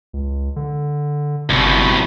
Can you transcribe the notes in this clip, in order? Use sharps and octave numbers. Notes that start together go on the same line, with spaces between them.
C#2
D3
G1 C2 B2